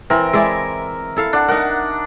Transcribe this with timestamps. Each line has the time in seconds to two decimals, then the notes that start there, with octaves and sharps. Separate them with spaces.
0.10 E3 C4 A#4 E5
0.33 G#3 E4 D5 E5
1.17 E4 A4 F5
1.33 D4 F#5
1.48 D#4 A#4 F#5